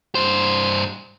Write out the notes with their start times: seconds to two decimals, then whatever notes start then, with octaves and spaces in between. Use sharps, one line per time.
0.15 G2 C5